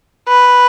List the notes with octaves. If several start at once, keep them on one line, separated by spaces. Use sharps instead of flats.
B4